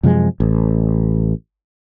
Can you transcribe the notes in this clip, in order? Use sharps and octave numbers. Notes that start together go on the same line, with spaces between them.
F#2 C3 F3 G#3
A1